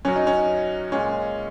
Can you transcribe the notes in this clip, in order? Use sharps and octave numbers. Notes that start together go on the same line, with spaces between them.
F#2 F#3 C#4
D#4
C#4
A#2 G#3 C#4